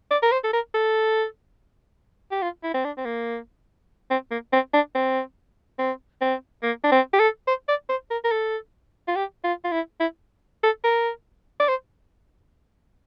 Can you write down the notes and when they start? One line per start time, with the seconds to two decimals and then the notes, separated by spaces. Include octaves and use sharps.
0.11 D5
0.23 A#4
0.32 C5
0.44 A4
0.53 A#4
0.74 A4
2.32 G4
2.42 F4
2.64 E4
2.74 C4
2.85 D4
2.98 C4
3.06 A#3
4.11 C4
4.31 A#3
4.53 C4
4.74 D4
4.95 C4
5.79 C4
6.21 C4
6.63 A#3
6.84 D4
6.92 C4
7.14 G4
7.19 A4
7.47 C5
7.68 D5
7.89 C5
8.11 A#4
8.24 A#4
8.31 A4
9.08 F4
9.16 G4
9.44 F4
9.64 F4
9.72 E4
10.00 E4
10.64 A4
10.84 A#4
11.60 D5
11.68 C5